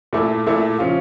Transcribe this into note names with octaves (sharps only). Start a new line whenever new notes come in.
A#2 A3 E4
A#2 A3 E4
C#3 F3 C#4 F4